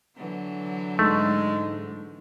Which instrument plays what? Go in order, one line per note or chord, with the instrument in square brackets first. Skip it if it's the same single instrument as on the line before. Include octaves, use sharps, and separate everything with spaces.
[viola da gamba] D3 E3 F#3
[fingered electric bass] G#2 [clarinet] G#3 [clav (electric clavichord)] A3